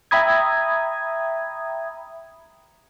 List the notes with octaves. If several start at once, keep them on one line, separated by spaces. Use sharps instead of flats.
E5 G5 A#5 B5 D#6 G#6